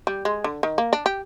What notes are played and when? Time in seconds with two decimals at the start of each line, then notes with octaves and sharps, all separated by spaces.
0.07 G3
0.25 G#3
0.44 D3
0.63 D#3
0.78 A#3
0.93 D4
1.06 G4